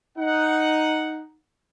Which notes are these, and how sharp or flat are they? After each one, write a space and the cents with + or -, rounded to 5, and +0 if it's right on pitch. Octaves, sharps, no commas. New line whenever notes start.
D#4 +0 F#5 +0